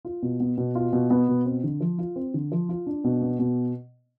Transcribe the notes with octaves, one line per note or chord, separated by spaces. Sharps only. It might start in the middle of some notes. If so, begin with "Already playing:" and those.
F4
B2
B3
B2
F4
B2
B3
B2
C4
D3
F3
F4
C4
D3
F3
F4
D4
B2
B3
B2